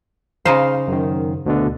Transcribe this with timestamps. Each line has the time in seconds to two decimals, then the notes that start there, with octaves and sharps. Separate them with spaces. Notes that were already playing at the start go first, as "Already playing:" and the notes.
0.45 C#3 D#4 C5 F5
0.88 F#2 D#3
1.46 D2 B2 D3